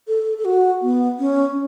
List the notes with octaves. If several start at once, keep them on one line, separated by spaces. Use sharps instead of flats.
A4
A4
F#4
B3
C#4